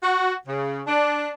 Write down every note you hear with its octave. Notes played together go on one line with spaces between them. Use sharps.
F#4
C#3
D4